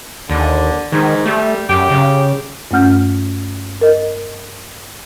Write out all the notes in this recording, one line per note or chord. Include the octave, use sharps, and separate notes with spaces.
D#2 D3
G#2 D#3
G3 A3
F#2 G4
C#3
G2 A3 C#4 F#5 F6 G6
A#4 D#5